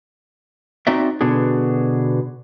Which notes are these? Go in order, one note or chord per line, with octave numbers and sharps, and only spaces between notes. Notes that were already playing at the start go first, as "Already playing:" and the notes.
C4 D#4 F#4 D5 E5
B2 D3 B3 D4 F#4 G#4